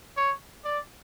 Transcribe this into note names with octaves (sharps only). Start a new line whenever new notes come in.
C#5
D5